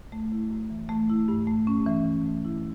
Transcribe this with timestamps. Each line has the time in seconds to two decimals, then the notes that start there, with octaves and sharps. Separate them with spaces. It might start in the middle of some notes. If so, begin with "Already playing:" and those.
0.12 A3
0.32 E4
0.51 F#2
0.70 E3
0.89 A3
1.10 E4
1.28 G2
1.47 A3
1.67 C#4
1.86 E3
2.06 E3
2.26 A3
2.45 E4